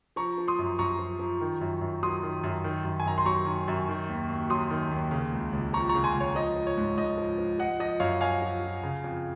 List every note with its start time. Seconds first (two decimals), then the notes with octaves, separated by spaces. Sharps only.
0.16 F3 A#5 C#6
0.38 F3
0.48 C6 D#6
0.59 F#2
0.79 F#2 A#5 C#6
0.99 F3
1.19 F3
1.41 D#3
1.61 F#2
1.81 F#2
2.03 F#3 C6 D#6
2.23 D#3
2.43 F#2
2.64 D#3
2.84 F#2
3.00 G#5
3.06 F#2 A#5
3.18 C6
3.25 F#3 A#5 C#6
3.46 D#3
3.68 F#2
3.89 D#3
4.09 D#2
4.29 D#2
4.49 F#3 C6 D#6
4.71 D#3
4.91 D#2
5.11 C#3
5.32 C#2
5.52 C#2
5.73 F3 A#5 C#6
5.89 A#5 C#6
5.95 C#3
6.04 G#5 C6
6.15 C#2
6.20 C#5
6.35 F3 D#5
6.56 F3
6.67 C#5
6.77 G#2
6.97 G#2 D#5
7.18 F3
7.38 F3
7.59 F3 D#5 F#5
7.80 F3 D#5
8.00 F#2 C#5 F5
8.21 F#2 F5 G#5
8.42 F3
8.62 F3
8.83 C#3
9.04 F2